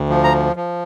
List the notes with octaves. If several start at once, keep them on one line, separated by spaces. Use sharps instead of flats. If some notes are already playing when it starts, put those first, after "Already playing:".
Already playing: D2
F3
A#5
F3